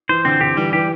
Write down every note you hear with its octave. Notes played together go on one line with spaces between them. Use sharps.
E3 C5
D3 C4
D3 G4
E3 G3
E3 G4